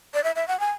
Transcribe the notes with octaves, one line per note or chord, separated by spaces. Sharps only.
D5
E5
E5
F#5
G#5